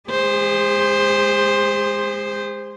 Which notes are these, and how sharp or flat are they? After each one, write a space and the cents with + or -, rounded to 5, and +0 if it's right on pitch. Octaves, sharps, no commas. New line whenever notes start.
G#3 +0 G#4 -45 C5 +0